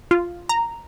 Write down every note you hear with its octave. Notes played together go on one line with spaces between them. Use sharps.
F4
A#5